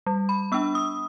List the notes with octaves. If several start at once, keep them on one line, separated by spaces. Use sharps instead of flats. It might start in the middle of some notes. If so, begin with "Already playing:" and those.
G3
B5
B3 D4 E6
D#6